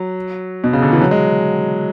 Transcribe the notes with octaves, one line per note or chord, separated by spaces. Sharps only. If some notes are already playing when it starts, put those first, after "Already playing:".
Already playing: F#3
B2
C#3
D3
E3
F#3
G#3